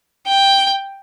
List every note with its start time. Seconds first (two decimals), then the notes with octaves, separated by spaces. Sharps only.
0.27 G5